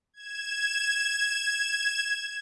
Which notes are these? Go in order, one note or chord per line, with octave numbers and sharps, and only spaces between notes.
G#6 E7